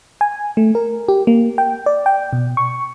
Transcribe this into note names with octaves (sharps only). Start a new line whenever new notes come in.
G#5
A3
A#4
G4
A#3
G5
D5
G5
B2
C#6